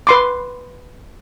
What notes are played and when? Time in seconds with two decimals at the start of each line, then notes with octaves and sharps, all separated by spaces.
0.07 B4 C6 D6